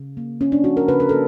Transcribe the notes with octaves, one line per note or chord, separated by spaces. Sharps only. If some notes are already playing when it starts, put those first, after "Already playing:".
Already playing: C#3
A#3
C#4
D4
F3 F#4
A#4
C#3 B4
A#4
A#3 A4